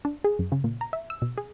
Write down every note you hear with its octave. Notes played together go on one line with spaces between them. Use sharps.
D4
G#4
F#2
C#3
A#2
A#5
E5
E6
B2
G#4